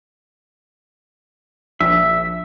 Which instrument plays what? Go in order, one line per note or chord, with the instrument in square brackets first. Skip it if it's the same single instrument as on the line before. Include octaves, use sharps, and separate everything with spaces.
[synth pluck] A#1 [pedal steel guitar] E5